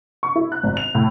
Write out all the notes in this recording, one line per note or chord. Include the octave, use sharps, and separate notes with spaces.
C#6
E4
F#6
G#1
F7
A2